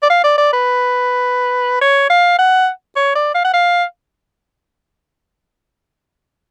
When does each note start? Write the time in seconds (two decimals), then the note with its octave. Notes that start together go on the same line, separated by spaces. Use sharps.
0.03 D5
0.10 F5
0.24 D5
0.38 D5
0.53 B4
1.82 C#5
2.10 F5
2.39 F#5
2.96 C#5
3.15 D5
3.35 F5
3.44 F#5
3.54 F5